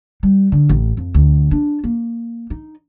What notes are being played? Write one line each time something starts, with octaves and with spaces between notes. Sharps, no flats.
G3
D3
A1
F2
D2
D4
A#3
D#4